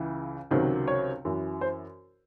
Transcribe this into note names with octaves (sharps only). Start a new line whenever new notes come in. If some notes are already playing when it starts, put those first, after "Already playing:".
Already playing: C#2 C#3 E3
C#2 C3 D#3 F#3
C#5
F#2 E3
C5